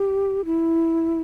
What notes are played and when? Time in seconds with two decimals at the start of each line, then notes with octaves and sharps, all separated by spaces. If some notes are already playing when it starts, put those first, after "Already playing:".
Already playing: G4
0.45 E4